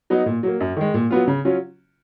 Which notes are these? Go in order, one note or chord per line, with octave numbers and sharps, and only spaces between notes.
F#3 B3 D#4
A#2
F#3 A#3
F#2
D#3 G#3
A#2
F#3 B3 F4
C#3
F#3 C#4 F4